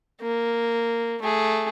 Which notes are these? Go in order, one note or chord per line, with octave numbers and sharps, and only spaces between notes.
A#3
A3 G#4